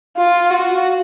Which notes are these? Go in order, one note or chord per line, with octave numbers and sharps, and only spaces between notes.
F4
F#4